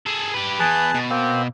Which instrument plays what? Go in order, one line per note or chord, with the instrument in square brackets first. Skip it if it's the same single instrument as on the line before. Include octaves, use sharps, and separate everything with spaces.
[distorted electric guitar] G#4 A4
G4 B4
[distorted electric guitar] E2 E3 [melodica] G#4 B4 A5
[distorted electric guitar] B2
[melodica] A#3 C4